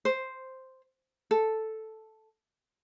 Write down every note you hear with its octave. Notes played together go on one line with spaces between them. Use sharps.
C5
A4